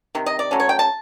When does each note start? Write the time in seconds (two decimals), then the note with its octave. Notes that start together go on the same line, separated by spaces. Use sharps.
0.15 C3 D#3
0.26 D#5
0.39 D5
0.51 F#3 A3 C#4
0.60 C#5
0.69 G5
0.79 A5